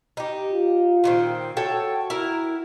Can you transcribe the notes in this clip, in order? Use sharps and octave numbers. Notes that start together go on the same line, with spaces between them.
D#4 G4
F4
A#2 D#3 C4
F#4 A4 C#5 G5
E4 A#4